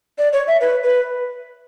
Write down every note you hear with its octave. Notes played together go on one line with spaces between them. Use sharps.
D5
C#5
E5
B4
B4